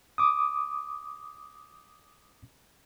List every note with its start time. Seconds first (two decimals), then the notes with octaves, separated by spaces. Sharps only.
0.18 D6 D#6